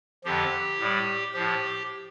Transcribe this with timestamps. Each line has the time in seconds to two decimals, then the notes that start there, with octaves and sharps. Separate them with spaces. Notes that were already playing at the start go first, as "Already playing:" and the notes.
0.24 F2 D3 F3 G4
0.79 A2 G3
1.34 A2 F3 G4